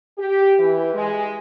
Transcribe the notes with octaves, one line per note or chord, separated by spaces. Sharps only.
G4
E3
G#3